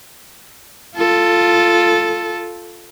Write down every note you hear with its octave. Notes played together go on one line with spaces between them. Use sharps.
F4 A4